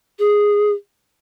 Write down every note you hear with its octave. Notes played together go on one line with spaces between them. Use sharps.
G#4